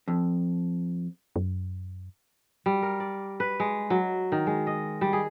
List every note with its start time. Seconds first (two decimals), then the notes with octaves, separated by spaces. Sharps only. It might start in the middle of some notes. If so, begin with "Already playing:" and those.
0.08 F2
1.36 F#2
2.66 G3
2.82 A#4
3.00 D5
3.40 B4
3.60 G#3
3.90 F#3
4.32 D#3
4.47 G#3
4.67 D#5
5.01 G3
5.13 G#4